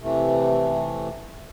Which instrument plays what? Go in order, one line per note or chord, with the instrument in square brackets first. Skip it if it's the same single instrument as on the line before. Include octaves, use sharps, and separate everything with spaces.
[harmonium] C3 E3 A3